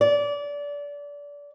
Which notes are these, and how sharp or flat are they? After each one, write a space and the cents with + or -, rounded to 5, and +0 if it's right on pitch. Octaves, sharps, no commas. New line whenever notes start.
D5 -25